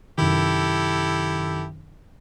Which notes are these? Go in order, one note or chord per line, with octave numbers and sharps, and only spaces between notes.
F#2 C3 D#3 E4 G4 A4